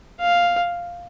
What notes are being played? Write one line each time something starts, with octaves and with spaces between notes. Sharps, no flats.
F5